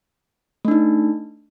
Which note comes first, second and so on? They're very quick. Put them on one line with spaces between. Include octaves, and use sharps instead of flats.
A3 D4 D#4